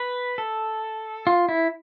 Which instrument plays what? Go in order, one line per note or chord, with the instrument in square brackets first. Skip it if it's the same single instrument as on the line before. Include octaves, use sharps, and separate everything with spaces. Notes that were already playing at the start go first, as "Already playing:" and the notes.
Already playing: [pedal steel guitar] B4
A4
F4
E4